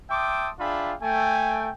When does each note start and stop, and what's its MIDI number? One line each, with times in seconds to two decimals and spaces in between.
0.10 0.50 76
0.10 0.50 79
0.10 0.50 81
0.10 0.50 84
0.10 0.50 86
0.10 0.50 87
0.60 0.94 62
0.60 0.94 65
0.60 0.94 68
0.60 0.94 76
0.60 0.94 79
0.60 0.94 83
1.03 1.71 57
1.03 1.71 79
1.03 1.71 80